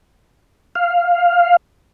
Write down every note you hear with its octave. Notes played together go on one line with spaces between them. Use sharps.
F5